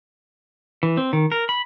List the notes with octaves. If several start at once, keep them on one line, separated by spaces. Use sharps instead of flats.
E3
C4
D#3
A#4
B5